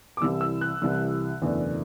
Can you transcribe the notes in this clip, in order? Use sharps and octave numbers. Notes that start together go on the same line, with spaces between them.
D6
C2 C3 E3 G3 E6
E6
F#6
C2 C3 E3 G3 E6
F#1 E2 B2 A3 D4